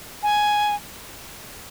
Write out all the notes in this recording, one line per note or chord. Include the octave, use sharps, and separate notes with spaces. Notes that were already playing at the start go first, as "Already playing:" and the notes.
G#5